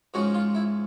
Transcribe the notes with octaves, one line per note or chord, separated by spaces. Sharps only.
G#2 F3 G#3 C#4 F#4
F4
E4